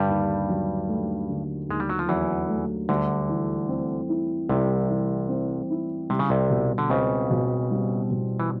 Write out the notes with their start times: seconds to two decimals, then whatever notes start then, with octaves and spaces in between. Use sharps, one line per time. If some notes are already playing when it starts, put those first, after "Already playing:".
Already playing: G2 D3 G3
0.09 D#2
0.48 F#3
0.89 A3
1.28 D3
1.69 D#2 G#3
1.80 G3
1.89 F#3
1.99 F3
2.08 E2 E3 F#3
2.48 A3
2.89 D2 D3 G3
3.29 E3
3.69 C4
4.09 E4
4.49 C2 C3 G3
4.89 E3
5.29 C4
5.70 E4
6.09 C3 G3
6.19 C#3
6.30 C2 C3
6.50 B2
6.78 D3
6.90 C#2 C#3 C4
7.30 B2
7.71 G3
8.11 B2
8.40 E3